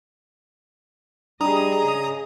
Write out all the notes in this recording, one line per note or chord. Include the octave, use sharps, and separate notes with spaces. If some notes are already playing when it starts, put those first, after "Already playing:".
G3 D4 G#4 D#5 A#5 D#6
C#3